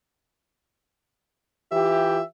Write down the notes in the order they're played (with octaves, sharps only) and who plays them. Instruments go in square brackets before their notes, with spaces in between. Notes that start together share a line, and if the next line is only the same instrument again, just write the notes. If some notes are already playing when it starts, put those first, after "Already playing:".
[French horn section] E3 F4 G4 [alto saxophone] E5